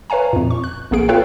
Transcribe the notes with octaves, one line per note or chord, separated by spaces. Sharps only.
B4 C#5 F5 G#5 A#5
F2 A#2
C#6
F#6
A#1 A#3 B3 G#4 D7
F4 A4 B4 C#5 F5 G5